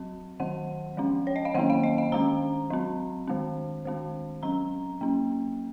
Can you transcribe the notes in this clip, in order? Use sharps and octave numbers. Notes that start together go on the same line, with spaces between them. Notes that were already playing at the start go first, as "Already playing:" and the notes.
Already playing: F#3 C4
D#3 F#3 C4 F#5
F3 G#3 C#4
C#5
D#5
F5
D#3 F#3 A#3 C#4 F#5
F5
D#5
F5
D#3 G#3 C#4 A#5
F#3 C4
D#3 G#3 C4
D#3 G#3 C4
F#3 C#4 A#5
F#3 A#3 C#4